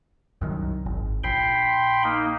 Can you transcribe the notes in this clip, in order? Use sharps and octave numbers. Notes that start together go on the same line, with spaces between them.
C2 F#2 D#3
G#1
A#1 G5 B5 C6
A#3 D#4